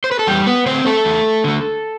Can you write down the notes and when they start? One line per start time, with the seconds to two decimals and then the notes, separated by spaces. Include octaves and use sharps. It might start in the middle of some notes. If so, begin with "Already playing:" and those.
0.04 C5
0.11 B4
0.19 A4
0.27 E2 G3 G4
0.46 B3 B4
0.66 D3 A3 C4 C5
0.86 A3 A4
1.05 E2
1.44 D3 A3